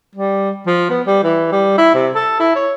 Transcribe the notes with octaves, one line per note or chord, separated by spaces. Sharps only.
G3
F3
B3
G3
E3
G3
E4
C3
A4
E4
C#5